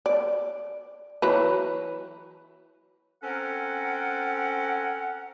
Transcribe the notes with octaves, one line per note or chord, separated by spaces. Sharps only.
D5
E3 F#3 B4
C4 C#4 A4 A#4 F#5